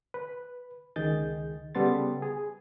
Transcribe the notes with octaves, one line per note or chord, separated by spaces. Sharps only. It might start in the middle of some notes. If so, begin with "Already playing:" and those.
B4
C#2 D#3 G#4 D#5 G6 A6
C#3 G3 B3 A4 C6 A6
G#4